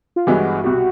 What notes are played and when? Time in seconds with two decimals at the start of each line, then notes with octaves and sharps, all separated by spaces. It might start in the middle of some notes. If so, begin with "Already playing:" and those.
0.16 F4
0.27 G1 G2 E3 G#3 B3 F#4
0.64 C2 B2 G3 F#4